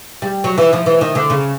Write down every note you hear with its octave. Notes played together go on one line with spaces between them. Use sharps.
G3
F#3
E3
F3
E3
D#3
D3
C#3